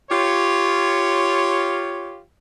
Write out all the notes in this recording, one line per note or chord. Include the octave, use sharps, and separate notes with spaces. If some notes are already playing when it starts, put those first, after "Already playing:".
F4 G4 C#5